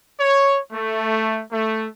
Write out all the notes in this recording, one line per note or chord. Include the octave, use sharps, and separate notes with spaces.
C#5
A3
A3